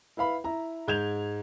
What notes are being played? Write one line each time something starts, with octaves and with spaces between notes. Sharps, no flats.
E4 B4 F5 B5
E4 A#5
G#2 G6 G#6 F7